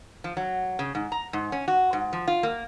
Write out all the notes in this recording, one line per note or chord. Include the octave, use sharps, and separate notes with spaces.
F3
F#3
C#3
G#2
A#5
G#2
C#4
F#4
G#2
F3
F4
A#3